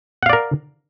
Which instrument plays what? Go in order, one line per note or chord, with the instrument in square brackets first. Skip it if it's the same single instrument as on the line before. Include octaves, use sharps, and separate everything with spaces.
[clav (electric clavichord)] F#5
F5
D5
A#4